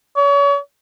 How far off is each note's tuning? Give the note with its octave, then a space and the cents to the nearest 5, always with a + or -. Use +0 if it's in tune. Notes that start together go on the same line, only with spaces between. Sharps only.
C#5 +35